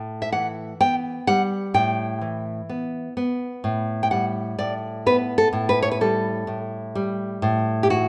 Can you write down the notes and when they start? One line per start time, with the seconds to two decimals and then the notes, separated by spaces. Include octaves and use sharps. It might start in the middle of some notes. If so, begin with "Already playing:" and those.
Already playing: A2
0.22 E5
0.32 E3 F#5
0.80 B3 G5
1.27 G3 F#5
1.74 A2 G5
2.22 E3
2.69 B3
3.17 B3
3.64 A2
4.03 G5
4.11 G3 F#5
4.59 A2 D5
5.06 B3 B4
5.38 A4
5.53 A2
5.69 B4
5.82 C#5
5.92 B4
6.01 G3 A4
6.47 A2
6.95 G3
7.42 A2
7.83 G4
7.90 E3 F#4